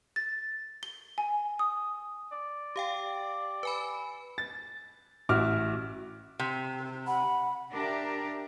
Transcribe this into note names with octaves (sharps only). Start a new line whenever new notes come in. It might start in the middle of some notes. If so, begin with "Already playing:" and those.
A6
G7
G#5
D#6
D5
G4 F5 G5
B4 G#5 B5
A6
A1 E4 F#4 D6 F6
C3
F#5 B5
D4 G4 A#4 D5 E5